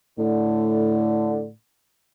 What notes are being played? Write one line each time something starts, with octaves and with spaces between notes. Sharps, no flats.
A2 D3